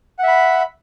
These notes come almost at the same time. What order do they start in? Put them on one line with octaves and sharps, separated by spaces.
F#5 E5 B5